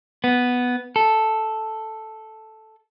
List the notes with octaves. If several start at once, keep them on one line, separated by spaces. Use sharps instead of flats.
B3
A4